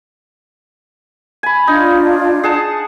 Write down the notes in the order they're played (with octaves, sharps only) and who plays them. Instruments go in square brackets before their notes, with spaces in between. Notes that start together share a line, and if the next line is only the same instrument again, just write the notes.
[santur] G#5 B5
[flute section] D4 F4 [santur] D#4
[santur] G#4 F#5 A5